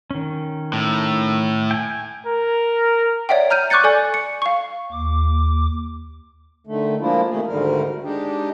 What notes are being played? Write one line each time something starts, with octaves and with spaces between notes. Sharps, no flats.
D#3 C#4
A2
G5 G#5
A#4
C#5 D5 E5 F#5 G5
A#5 F6 G6 D#7
C#6 D6 F#6 G6 A6 C#7
A4 D5 G#5
C#7
F5 C#6
D#2 D6
D3 D#3 A3
F3 G#3 A#3 D4 E4 F4
C3 D#3 A3 G#4
D2 G#2 D3 D#3 G3 A#4
G#3 D4 D#4 G4